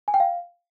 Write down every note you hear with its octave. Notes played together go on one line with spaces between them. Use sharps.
G#5
G5
F5